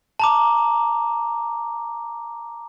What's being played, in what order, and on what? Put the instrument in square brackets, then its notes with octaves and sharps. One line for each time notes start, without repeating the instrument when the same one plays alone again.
[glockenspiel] A5 A#5 D6